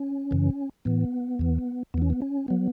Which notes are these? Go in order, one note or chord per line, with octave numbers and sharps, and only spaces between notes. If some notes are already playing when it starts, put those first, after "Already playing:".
Already playing: C#4
F#2 C#3 E3
A2 E3 B3
E2 E3
E2 E3 B3 C#4
B3
C#4
F#3 B3